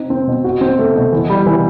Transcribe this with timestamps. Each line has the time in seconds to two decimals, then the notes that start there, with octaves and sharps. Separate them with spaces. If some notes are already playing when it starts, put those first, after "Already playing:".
Already playing: C4 D#4
0.10 C4
0.27 B2
0.44 F#4
0.61 C4
0.79 A3
0.96 B2
1.12 E3
1.30 G3
1.46 E3